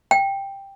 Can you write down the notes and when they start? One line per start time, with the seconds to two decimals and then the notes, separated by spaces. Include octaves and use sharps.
0.11 G5